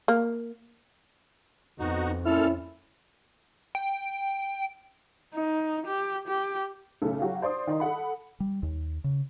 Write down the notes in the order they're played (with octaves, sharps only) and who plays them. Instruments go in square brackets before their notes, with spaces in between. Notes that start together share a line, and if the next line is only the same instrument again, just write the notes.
[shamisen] A#3
[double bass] F2 [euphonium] B2 [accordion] D#4 F#4
[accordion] A#2 A4 F6 [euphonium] C#4 [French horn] E4
[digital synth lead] G5
[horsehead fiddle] D#4
G4
G4
[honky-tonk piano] B1 A2 C#3 A4
F#3 F#4 G4 F5
C5 D5 C6 D#6
D#3 D#4 C6
A4 F#5 B5
[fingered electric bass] G3
D#2
C#3